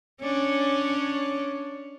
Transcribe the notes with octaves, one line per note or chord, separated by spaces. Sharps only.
C#4 D4